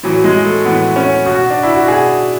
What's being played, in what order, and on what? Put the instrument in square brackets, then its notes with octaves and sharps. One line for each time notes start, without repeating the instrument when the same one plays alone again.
[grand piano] A2 E3 F#3
G#3
A3
A2 E3 B3
C#4
B2 F#4
D4
E4
F#4
B2 G#4